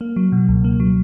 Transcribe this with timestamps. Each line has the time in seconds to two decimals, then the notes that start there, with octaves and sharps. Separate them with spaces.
0.01 A#3
0.16 F#3
0.32 B2
0.48 C#2
0.64 A#3
0.80 F#3